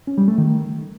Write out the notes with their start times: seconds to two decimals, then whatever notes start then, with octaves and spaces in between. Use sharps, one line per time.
0.07 C#4
0.18 G3
0.28 A3
0.38 D#3